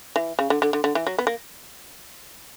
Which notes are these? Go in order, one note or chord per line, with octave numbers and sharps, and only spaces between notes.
E3
C#3
D3
D3
D3
D3
E3
F#3
B3
A#3